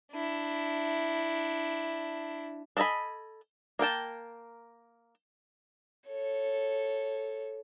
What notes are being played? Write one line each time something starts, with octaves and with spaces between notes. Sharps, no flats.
D4 E4
D4 A4 D#5 G#5 B5
A#3 A#4 G5 A5
A4 C#5